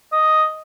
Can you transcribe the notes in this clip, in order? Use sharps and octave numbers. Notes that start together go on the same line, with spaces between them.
D#5